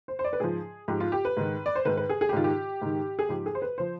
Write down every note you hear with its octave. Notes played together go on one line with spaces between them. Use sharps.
C5
C5
D5
B4
G#2 F3 G#4
G#2 F3 G4
F4
G4
B4
G#2 D#3
D5
C5
G#2 D#3 B4
B4
G#4
G#4
G4
G#2 D#3 F4
G4
G#2 D#3
G#4
G#2 F3 G4
G#4
C5
B4
F3 C5